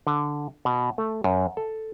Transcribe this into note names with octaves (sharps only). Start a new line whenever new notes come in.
D3
B2
A3
F#2
A4